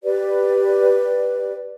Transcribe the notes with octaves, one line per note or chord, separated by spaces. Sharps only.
G4 B4 D5